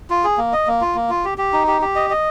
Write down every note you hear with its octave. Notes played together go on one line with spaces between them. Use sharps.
F4
G#4
A#3
D#5
A#3
F4
A#3
F4
G4
G4
D#4
G4
G4
D#5
D#5